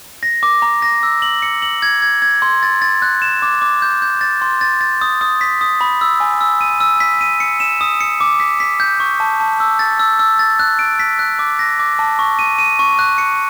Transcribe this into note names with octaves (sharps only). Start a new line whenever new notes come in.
A#6
D6
A#5
A#6
E6
F#7
C#7
F#7
G#6
G#6
G#6
C6
A6
A6
F#6
E7
D6
D6
G6
G6
A6
C6
A6
A6
D#6
D#6
B6
D#6
B5
E6
G#5
E6
D#7
E6
B6
D#7
C#7
E7
D#6
C#7
D6
B6
B6
G6
C#6
A5
A5
E6
A6
E6
E6
A6
F#6
D7
B6
F#6
D6
A#6
D6
A5
C#6
D#7
D#7
C#6
F#6
C#7